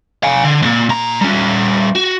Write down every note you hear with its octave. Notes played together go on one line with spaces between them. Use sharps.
F5 G#5
D3
D#2 A#2
A#2 A#5
G3 C#4
F#4